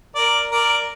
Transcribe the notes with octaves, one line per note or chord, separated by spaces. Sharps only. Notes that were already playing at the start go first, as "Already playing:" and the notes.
A#4 D5
A#4 D5